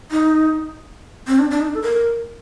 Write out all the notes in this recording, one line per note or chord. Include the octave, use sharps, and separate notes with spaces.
D#4
C4
D4
D4
D#4
A4
A#4